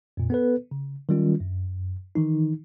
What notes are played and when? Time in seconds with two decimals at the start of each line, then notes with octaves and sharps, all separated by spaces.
0.17 F2 A#2
0.30 B3 A4 B4
0.71 C#3
1.09 D#3 F#3 G3 C#4 F4
1.40 F#2
2.15 D#3 E3 D#4